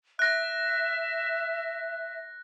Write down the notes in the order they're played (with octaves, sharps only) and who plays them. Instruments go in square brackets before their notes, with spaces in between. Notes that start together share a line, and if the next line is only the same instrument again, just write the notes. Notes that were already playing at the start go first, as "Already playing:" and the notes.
[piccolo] E5 [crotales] F#6 A#6